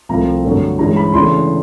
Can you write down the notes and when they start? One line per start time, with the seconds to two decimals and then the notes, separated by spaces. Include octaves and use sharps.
0.09 C2 C3 F3 A3 C4 A#5
0.44 G2 D3 F#3 A3
0.79 G2 E3 G#3 C#4 A#5
0.96 B5
1.14 E2 C#3 E3 A3 D4 C6